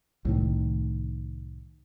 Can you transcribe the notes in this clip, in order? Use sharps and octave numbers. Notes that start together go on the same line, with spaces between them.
C2 A2 D#3